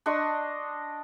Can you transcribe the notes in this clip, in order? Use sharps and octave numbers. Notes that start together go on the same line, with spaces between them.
D4 D#5 C6 C#6